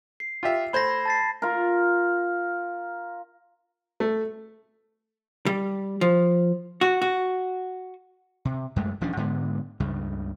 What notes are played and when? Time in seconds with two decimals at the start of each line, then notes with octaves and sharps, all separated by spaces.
0.20 C7
0.43 F4 G4 E5
0.73 A3 C5 B5 G#6 A#6
1.06 A5 A6 C7
1.42 F4 A#4
4.00 A3
5.46 G3
6.01 F3
6.81 F#4
7.02 F#4
8.45 C3
8.76 F#2 G#3 A3
9.01 D#1 F3 C#4 D4
9.17 G#2 D3 G#3 B3
9.80 C#2 G2 C#3